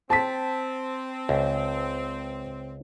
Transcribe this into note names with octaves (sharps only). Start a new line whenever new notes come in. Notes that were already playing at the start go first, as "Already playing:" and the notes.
C4 A5 B6
C#2